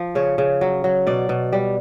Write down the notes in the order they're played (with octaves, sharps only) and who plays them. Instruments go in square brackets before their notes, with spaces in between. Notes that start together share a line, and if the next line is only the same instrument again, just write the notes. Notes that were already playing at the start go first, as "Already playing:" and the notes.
Already playing: [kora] F3
C#3 C#5
C#3
F#3
F#3
B2 D5
B2
G3